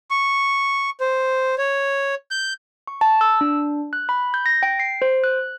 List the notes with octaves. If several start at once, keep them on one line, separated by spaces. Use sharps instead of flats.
C#6
C5
C#5
G6
C#6
A5
E6
D4
F#6
B5
G6
A#6
G5
C7
C5
F#6